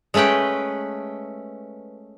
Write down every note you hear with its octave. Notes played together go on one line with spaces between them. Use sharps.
G#3 A3 C#4 B4 G5